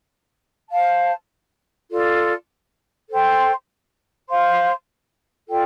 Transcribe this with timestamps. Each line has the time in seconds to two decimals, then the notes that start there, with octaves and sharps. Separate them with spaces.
0.70 C5 F5 A5
1.90 F4 A4 D5
3.09 A4 C5 G5 C6
4.29 C5 F5 C6
5.48 F4 A4 D5 G5